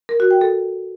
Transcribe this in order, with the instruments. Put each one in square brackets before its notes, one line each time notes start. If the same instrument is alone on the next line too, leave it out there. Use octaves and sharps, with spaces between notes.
[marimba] A#4
F#4
G5
A4